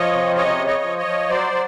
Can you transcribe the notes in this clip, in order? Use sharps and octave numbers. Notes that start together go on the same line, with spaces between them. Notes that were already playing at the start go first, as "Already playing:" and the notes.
Already playing: F3 C#5 D#5
C3
C#3 C#5 D#5
C#3
C#5 D#5
F3
C#5 D#5
F3
F#3 C5 D5
F#3